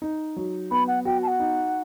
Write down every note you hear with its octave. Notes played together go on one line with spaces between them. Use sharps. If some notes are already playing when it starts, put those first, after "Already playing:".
D#4
F#3
B3 B5
F#5
F#4 G5
A5
F#5
D#4